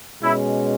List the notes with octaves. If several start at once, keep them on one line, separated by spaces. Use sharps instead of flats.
B2 G#3 C#4 E4